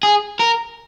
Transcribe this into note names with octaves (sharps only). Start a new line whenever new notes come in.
G#4
A#4